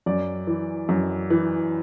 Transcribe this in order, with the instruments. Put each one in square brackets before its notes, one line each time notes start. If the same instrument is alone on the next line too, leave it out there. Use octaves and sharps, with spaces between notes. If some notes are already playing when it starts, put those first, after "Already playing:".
[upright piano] F#2 D5
E3
F#2
E3